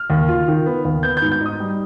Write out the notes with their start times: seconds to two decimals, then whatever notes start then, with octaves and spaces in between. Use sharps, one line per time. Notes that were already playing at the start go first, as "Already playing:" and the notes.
Already playing: F6
0.10 D#2
0.29 F4
0.48 D#3
0.66 B3
0.85 D#2
1.03 B3 G6
1.17 G6
1.22 G#2
1.32 G6
1.41 D#4 D#6
1.60 G3